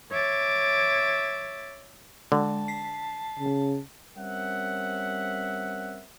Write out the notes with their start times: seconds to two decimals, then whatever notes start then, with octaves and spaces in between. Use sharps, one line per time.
0.10 C#5 E5 D6 A6
2.32 D3 G#3 A5
2.68 B6 C7
3.39 C#3
4.17 G3 C4 C#4 A#4 E5 F#5